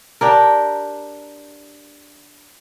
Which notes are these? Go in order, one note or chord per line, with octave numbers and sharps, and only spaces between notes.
D4 G4 A#4